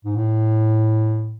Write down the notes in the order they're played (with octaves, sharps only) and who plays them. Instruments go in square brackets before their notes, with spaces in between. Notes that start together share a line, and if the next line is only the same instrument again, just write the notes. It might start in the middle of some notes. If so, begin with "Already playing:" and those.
[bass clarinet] G#2
A2